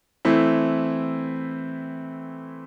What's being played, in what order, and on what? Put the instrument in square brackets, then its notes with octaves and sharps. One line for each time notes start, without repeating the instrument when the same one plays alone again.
[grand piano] E3 A3 C4 E4